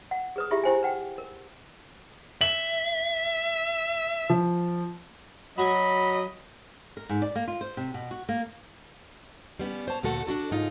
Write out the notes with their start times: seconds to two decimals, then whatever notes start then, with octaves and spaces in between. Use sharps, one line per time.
0.11 F#5
0.36 G#4 B4 D#6
0.51 E4 F4 G4 G#4 E5
0.64 E4 G4 C5 G5 G#5
0.83 B4 F#5 G5
1.18 A#4
2.41 E5 F#7
4.30 F3
5.58 F#3 F#4 D#5 G#5 B5
6.97 A#4
7.09 G#2
7.22 D5
7.35 A#3
7.47 F4
7.61 C5
7.77 C3
7.94 B2
8.11 F#4
8.29 A#3
9.60 G3 B3 C#4
9.88 C5 C#5 A5
10.03 D2 A#2 A3 F#4 A4 F#5
10.27 D4 F#4 A4
10.51 G#2 C#3 D#4 F4